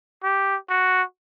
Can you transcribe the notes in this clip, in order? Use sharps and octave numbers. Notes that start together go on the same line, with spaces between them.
G4
F#4